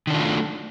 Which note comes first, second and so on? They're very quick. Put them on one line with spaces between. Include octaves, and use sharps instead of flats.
D#3 D4 F4 F#3 A3